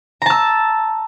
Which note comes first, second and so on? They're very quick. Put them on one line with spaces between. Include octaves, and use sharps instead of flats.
A#5 A5 E6